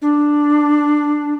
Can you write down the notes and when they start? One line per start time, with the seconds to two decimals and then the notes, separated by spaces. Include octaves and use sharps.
0.02 D4